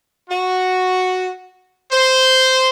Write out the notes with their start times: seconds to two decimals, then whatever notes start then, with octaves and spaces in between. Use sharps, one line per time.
0.29 F#4
1.92 C5